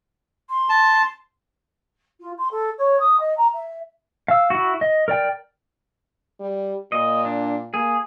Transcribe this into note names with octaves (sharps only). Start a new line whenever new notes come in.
C6
A5
F4
C6
A4
C#5
D#6
D#5
A#5
E5
F5 E6
E4 F#4
D#5
A#4 D5 G5
G3
A#2 D#5
D4
A#3 G#4